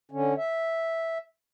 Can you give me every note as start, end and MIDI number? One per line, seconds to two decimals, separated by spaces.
0.12 0.34 50
0.12 0.34 61
0.38 1.18 76